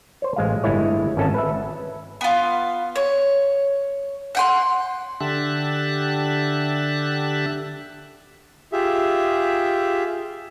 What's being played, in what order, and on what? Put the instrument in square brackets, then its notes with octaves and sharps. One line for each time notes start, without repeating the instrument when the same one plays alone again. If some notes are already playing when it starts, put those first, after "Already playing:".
[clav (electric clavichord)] C5 C#5
A1 G#3 F5
G1 G2 G#3 A3 E4 C#5
G#1 C#4 A4 D#5 A5
B4 E5
[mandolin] B3 F4
C#5
F#5 G5 C6
[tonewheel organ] D3 G4 E5 A5 F#6
[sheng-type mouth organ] F4 G4 G#4 E5